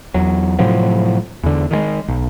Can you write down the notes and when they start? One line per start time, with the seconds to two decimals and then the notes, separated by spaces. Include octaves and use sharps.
0.14 E2 F#3
0.59 A2 C3 F3 F#3
1.43 E2 D3
1.71 D#3 E3 G#3
2.08 B1